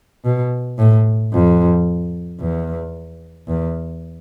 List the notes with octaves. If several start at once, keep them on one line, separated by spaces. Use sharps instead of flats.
B2
A2
F2
E2
E2